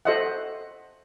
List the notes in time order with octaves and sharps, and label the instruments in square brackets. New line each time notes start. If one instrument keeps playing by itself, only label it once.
[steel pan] F#4 A4 C5 D#5 E5 F#5